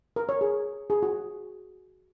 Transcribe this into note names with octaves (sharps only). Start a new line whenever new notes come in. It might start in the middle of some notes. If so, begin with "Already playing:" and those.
A#4
C#5
G#4
G#4
F#4